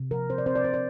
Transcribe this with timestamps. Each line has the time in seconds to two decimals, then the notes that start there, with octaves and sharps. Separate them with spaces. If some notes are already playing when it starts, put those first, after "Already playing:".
Already playing: C3
0.11 F3 A#4
0.29 C4 C5
0.38 D5
0.46 C4 C5
0.55 D5
0.64 C3 C5
0.74 D5